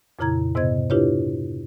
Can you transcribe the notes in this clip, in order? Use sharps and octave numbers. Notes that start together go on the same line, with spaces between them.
F2 A#2 C#3 E4 A#5 G#6
G#2 C3 B3 C5 D#5 G#6
D4 E4 F4 G4 B4 C#5